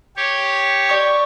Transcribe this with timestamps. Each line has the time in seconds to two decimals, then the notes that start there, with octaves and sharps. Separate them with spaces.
0.17 G4 C#5
0.89 D5 C#6 D6